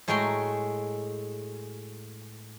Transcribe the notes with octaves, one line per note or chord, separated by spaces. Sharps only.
A2 G#3 F#4 G5 A#5 C6